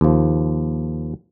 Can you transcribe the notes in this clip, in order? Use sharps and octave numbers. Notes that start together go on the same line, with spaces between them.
D#2 F3